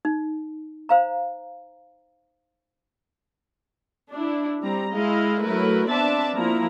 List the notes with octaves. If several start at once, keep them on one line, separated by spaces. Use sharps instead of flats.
D#4
C5 F5 A#5
D4 E4
G3 C4 A#5
G#3 E4 D#5 F5
F#3 A3 E4 A#4 B4
B3 C4 D4 D5 E5 A5
F3 A#3 E4 A#5